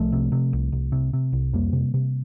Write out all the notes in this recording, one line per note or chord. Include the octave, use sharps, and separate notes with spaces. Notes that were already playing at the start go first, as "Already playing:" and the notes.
Already playing: C2 F3 A3
C3
C3
C2
C2
C3
C3
C2
F2 G3 A#3
C3
C3